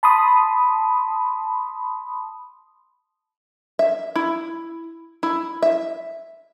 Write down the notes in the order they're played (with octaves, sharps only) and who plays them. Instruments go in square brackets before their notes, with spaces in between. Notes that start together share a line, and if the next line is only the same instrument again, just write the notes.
[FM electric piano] A5 B5 C6 D#6
[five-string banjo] E5
E4
E4
E5